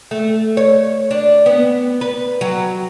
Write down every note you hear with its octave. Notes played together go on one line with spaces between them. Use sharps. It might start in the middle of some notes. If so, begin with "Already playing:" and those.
A3
C#5
D4
B3
B4
F#3